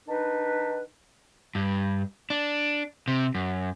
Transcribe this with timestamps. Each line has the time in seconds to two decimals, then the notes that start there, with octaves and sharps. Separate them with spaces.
0.07 D#3 D4 D#4 B4
1.55 G2
2.30 D4
3.08 C3
3.35 F#2